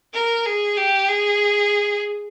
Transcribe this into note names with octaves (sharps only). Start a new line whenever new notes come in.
A#4
G#4
G4
G#4